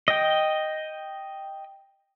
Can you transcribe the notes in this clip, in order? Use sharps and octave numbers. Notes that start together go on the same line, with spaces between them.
D#5 G5